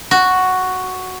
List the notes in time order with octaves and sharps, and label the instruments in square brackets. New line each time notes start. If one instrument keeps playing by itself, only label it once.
[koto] F#4